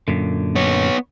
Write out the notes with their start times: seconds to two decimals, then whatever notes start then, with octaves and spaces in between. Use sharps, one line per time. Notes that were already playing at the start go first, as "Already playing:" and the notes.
0.08 F#2 A#2 D3
0.56 B3 C#5